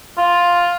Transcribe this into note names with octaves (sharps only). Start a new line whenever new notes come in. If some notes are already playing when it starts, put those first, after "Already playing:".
F4